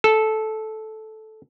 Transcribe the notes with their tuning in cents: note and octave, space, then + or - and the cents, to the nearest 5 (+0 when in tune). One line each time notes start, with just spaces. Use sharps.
A4 -10